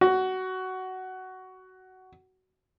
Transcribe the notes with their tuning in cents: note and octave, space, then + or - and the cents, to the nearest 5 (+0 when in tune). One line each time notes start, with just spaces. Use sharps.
F#4 +15